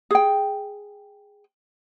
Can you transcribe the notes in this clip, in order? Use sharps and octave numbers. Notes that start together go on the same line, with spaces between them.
G#4 G5